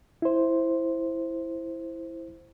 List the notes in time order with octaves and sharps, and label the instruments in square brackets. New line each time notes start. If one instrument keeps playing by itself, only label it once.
[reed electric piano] E4 C5